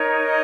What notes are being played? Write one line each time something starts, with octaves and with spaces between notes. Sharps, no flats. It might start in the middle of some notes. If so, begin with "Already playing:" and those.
Already playing: D#4 A#4 C#5
D#5